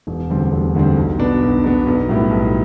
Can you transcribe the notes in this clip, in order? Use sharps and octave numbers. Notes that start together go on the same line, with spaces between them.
E1
D2 D3 G3 C4
E1
D2 D3 G3 C4
B1
B2 B3 D4
B1
B2 B3 D4
B1
A2 G3 B3 E4
B1